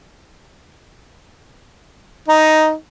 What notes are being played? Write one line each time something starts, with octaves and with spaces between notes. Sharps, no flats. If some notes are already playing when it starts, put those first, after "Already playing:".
D#4